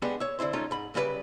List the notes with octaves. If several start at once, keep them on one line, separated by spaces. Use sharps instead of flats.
G#3 B3 D4 G4 F#5
C#5 E5
D3 C4 E4 C5
G#3 A3 C#4 D#4 F4
G#2 B5
F#2 C#3 G3 F4 B4 D5